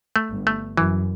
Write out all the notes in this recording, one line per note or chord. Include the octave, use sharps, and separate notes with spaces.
A3
G1 G2
A3
F#2 E3